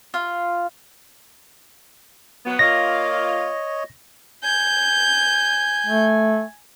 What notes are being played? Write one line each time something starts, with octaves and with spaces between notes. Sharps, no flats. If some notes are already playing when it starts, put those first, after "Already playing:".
F4
F#3 B3
A#3 F4 C#5 D#5 A#6
G#5 G6
A3